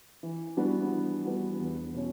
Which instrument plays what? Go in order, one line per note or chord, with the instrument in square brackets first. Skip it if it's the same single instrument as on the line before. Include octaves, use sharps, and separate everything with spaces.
[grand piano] E3
G3 B3 D4 F#4
E3
G3 B3 D4 F#4
E2
B2 F#3 C#4